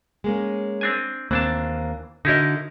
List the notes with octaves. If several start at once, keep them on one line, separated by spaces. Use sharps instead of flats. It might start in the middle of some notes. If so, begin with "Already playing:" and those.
G#3 A#3 C#4
C4 D4 G#5
D#2 E3 A#3 C4 D4 A5
D3 D#4 E4 F#4 A#4 D#5